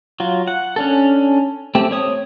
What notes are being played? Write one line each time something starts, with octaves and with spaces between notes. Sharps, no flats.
F#3 F4
F#5
C#4 D4 A4
A3 C4 G4
C4 C#5 D#6